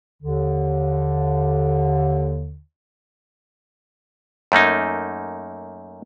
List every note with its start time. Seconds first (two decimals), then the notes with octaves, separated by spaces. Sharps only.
0.22 D#2 D3
4.52 F#2 A3 A#3 D#4